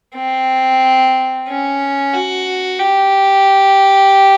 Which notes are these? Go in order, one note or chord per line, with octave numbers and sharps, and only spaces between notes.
C4
C#4
F#4
G4